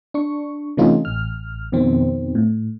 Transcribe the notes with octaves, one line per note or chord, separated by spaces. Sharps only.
D4 C#6
C3 E3 A3 C#4 D#4 F4
A1 F6
F2 B2 D#3 C4
A2